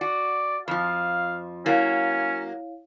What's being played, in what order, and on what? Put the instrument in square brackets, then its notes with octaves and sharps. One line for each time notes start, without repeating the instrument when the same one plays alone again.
[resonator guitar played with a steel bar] F#4 [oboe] D5
[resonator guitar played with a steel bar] F2 F3 [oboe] F5
[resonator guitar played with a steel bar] F#3 A#3 [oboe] C#4 [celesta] E4 C#5 F5